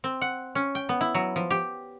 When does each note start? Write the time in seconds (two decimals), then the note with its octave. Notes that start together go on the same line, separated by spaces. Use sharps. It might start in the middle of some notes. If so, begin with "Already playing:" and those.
0.04 C4
0.21 F#5
0.55 C#4
0.75 G5
0.89 B3
1.01 E4
1.15 F#3
1.36 F3
1.51 G4